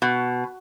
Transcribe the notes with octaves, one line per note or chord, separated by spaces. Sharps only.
B2